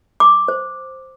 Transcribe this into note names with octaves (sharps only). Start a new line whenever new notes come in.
D6
C5